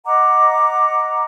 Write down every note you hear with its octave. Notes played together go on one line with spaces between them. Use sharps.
D#5 F#5 A#5 D6